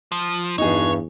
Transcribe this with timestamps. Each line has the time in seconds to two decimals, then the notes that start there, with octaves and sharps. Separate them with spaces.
0.12 F3
0.58 E2 G2 D#4 F#4 G#4 C#5